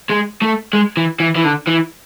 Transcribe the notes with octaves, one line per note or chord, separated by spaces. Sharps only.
G#3
A3
G#3
E3
E3
E3
D3
E3